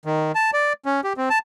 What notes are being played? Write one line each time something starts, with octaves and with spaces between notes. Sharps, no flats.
D#3
A5
D5
C#4
G4
C4
A5